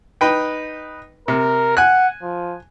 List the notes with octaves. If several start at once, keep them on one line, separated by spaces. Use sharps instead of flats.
D#4 B4 G5
C3 A#4
F#5 G#5 F#6
F3